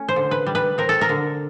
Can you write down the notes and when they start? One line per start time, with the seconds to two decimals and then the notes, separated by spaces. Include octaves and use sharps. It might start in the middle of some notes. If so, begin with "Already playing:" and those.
Already playing: A3 C#4
0.08 C5
0.16 D3
0.31 B4
0.46 G3
0.55 B4
0.78 C4 A#4
0.89 A4
1.01 A#4
1.09 D3